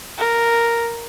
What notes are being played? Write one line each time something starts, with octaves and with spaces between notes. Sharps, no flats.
A#4